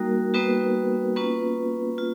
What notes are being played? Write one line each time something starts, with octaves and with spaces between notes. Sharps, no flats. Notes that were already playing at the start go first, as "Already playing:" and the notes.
Already playing: G3 A#3 D#4 F#4 A#4
G3 A#3 B3 D#4 F#4 B4
A#3 B3 C#4 F4 B4
F4